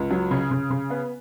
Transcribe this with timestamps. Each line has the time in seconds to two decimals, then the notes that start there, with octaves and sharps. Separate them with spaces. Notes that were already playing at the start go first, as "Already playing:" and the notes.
Already playing: C#2
0.11 F#3
0.31 C#3
0.51 C#3
0.70 C#3
0.90 B3